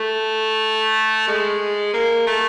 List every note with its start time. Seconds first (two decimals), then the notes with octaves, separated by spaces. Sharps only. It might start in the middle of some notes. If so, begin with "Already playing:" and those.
Already playing: A3
1.28 G#3
1.94 A#3
2.27 A3